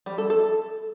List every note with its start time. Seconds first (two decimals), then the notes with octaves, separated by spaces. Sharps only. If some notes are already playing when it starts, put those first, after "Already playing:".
0.06 G3
0.18 A4
0.30 A4